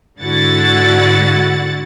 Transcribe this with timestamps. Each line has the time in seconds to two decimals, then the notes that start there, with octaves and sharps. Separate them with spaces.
0.19 G#2 D3 E4 F#4 F#5 A6